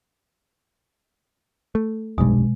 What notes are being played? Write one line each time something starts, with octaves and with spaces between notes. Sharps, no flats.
A3
F1 B1 G2 B2 G#3